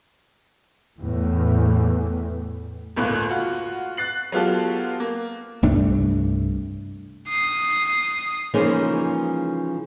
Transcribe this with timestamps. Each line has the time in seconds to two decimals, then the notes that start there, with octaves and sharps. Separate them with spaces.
0.98 E2 A2 E3
2.97 G1 C#2 A2 A#3 F#6
3.30 F4 F#4
3.97 F#6 A6 C7 F#7
4.32 F#3 G#3 B3 F4 G4 A4
5.00 A#3
5.63 C2 G2 A3 D4
7.29 D#6 C7
8.54 C#3 E3 F3 G#3 A#3 D#4